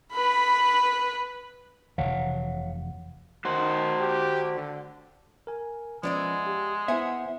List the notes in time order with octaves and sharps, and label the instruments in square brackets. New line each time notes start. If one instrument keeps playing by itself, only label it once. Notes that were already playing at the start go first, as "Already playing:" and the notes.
[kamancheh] B4 B5
[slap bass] F1 C3 E3 [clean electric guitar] C#5 F5 F#5
[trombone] D#3 [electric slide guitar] F#4 C5
[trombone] G4
D3
[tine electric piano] A#4 G#5
[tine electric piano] F3 C#4 [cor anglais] G#3 [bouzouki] B3 D5 E5
[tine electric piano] G4
[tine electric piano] B3 E4 [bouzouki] C5 F#5 G#5 [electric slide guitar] E5